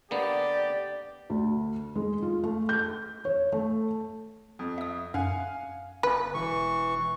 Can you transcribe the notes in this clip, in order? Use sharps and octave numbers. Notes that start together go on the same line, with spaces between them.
D3 A#3 B3 G4 D5
D2
G#3
F4
A3
G6
C#5
A3
F2
E5 D#6
F#2 F5 F#5 G#5
G1 B4
E1 E3 C#6